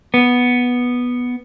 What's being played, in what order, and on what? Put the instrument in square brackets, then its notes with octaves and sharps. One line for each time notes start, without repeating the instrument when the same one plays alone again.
[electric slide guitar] B3